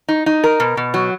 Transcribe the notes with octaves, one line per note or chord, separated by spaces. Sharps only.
D#4
D#4
A#4
B2
B2
F#3